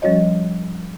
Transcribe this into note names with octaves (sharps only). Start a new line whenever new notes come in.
F3 G3 C#4 F#4 C#5 D#5